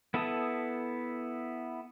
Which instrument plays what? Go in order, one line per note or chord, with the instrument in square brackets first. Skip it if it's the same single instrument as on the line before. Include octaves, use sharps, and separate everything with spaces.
[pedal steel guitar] B3 E4 A4 A5 D#6